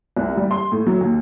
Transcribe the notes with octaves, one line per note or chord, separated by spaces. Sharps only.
C2
G3
C6
A2
F#3
D#2